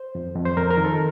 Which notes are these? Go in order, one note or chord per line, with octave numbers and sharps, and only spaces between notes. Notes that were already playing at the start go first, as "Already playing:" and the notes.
Already playing: C5
F2
F2
C5
F2 A#4
A#4
D#3
A4